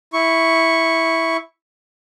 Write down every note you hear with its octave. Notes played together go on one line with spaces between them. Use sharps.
E4 C#6